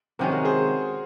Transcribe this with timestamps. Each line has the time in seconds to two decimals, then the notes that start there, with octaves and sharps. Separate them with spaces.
0.19 C3 D#3 G#3 C#4 F#4 A#4
0.32 F#4 A#4
0.45 G#4 C5